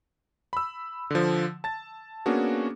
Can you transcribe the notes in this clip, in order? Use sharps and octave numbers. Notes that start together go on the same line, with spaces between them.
B5 E6
D3 F3
A5 A6
A#3 B3 C#4 D4 F#4 G#4